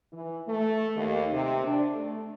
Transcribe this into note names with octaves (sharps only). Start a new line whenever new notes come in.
E3
A3
D#2
C3
D4
A3